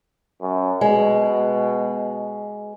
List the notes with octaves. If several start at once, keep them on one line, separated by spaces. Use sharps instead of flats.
F#2
B2 G#3